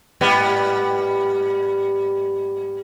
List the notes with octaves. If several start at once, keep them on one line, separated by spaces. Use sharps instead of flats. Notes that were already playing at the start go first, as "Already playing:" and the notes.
G#2 G3 B3